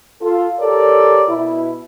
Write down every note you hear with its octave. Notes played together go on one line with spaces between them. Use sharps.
F4 A4
G4 A4 A#4 C#5 D5
B2 E4